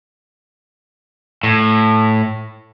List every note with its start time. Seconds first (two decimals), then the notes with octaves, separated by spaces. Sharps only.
1.43 A2